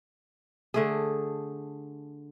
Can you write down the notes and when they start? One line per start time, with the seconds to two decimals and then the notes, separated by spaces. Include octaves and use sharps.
0.74 D3 A3 G#4